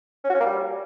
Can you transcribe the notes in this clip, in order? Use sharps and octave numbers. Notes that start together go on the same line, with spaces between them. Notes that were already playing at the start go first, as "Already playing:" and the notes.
C#4
F#4
C#4
A#3
G3